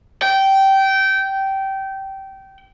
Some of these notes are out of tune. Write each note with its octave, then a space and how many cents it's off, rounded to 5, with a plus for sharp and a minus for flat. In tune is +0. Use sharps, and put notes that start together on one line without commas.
G5 -20